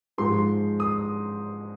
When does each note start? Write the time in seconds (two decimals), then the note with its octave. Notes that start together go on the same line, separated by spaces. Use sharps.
0.18 G#2 F3 G#3 C6
0.80 D#6